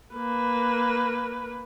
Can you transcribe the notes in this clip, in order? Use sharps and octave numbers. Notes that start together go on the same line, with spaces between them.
A#3 B4